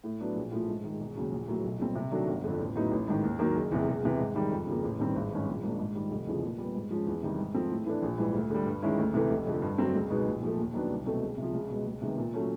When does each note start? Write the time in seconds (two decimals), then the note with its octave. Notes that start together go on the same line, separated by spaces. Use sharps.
0.04 A2
0.20 F#3 B3 D4
0.35 A#1
0.52 A2 F3
0.68 G#2
0.84 D#3 G#3
1.00 E1
1.16 D#2 C#3 F#3
1.32 A#1
1.48 A2 F#3 A#3
1.64 B1
1.79 A#2 G3 C4
1.95 C3
2.11 D#3 F#3 A3 D4
2.27 G1
2.44 F2 D3
2.60 A1
2.76 A2 F#3 B3 D#4
2.91 A1
3.07 G#2 D#3
3.23 D#2
3.39 D#3 F#3 A#3
3.55 F#1
3.71 E2 C3
3.87 E1
4.03 E2 C3 E3
4.19 G#2
4.35 D#3 G3
4.51 F2
4.67 C#3 F3 A#3
4.83 A1
4.99 G2 D#3 G3 C4
5.16 G#1
5.31 G2 D#3 G#3 C#4
5.47 A#1
5.63 G#2 F3 A#3 D4
5.79 G#2
5.95 D#3 G3
6.11 F1
6.27 E2 C#3 F3
6.43 A#2
6.58 G3 B3
6.74 G#2
6.90 F3 G#3 C#4
7.07 E2
7.22 C3 D#3 G3
7.39 G#2
7.54 F3 A3 C4
7.71 A2
7.86 E3 A3 D4
8.02 A#1
8.18 G#2 E3 G3
8.35 D2
8.50 D3 G3
8.66 G2
8.82 D#3 G#3 C#4 E4
8.98 D2
9.14 C3 E3 A3
9.30 F1
9.47 F2 D3
9.62 G2
9.78 D3 F#3 A3 C4
9.94 C#2
10.10 B2 G#3 B3 D#4
10.26 A#1
10.42 A#2 F3 A3
10.59 D#2
10.74 D#3 F#3 B3 D4
10.90 C2
11.06 B2 F#3 A3 C4
11.21 C#2
11.38 C3 F3
11.54 C#2
11.70 B2 G#3
11.86 C#2
12.02 C3 D#3 G#3 B3
12.17 A#2
12.34 F#3 A3 C#4